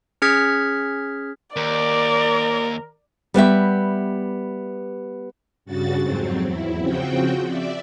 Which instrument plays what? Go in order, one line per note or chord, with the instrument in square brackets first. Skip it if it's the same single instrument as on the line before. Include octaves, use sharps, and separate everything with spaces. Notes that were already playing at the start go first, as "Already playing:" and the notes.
[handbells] C#4 G#4 F6 G#6 B6
[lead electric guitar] D#2 [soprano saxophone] A#4 [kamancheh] D5
[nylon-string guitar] G3 B3 G4 E5
[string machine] G2 C#3 F#4 A6
F2 G#2 F#3 C4
E2 E4
C#3 F3 C4 F#4 G5
D5 E5